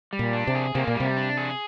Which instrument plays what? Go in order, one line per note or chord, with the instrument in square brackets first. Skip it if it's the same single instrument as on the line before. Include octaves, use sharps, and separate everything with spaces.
[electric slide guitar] G3
[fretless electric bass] A#2
[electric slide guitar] D4
[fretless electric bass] C3
[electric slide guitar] G#4
[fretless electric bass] C3 [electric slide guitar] A#3
[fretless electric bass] A#2
[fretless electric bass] C3 [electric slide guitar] G3
[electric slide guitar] D4
G#4